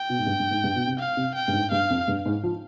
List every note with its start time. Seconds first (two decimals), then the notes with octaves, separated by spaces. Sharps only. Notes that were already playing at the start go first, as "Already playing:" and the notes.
Already playing: G5
0.10 B2
0.19 G#2
0.26 G2
0.40 G2
0.51 G#2
0.64 G2
0.76 B2
0.87 C3
0.99 F5
1.17 C3
1.35 G5
1.48 G2
1.53 G#2
1.71 G2 F5
1.90 F2
2.08 G2
2.26 G#2
2.43 F3